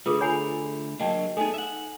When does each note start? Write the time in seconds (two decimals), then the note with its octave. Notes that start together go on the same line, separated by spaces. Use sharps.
0.06 D3 A3 F4 G#4 B4 D#6
0.21 C#5 G#5 A#5 B5 C7 F7
1.00 F#3 A#3 D4 D#5 G5 A5
1.37 A3 B3 D#4 G#4 A4 G#5
1.54 E5 F#5